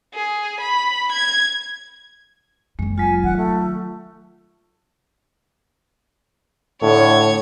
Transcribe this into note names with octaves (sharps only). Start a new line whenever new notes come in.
G#4
B5
G#6
F#1 F#2 G#3
F#3 F4 G#5
D#3 F#5
A3
A2 D3 C#5 G#6